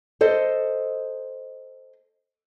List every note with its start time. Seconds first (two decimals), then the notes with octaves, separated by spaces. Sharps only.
0.21 A4 C5 D#5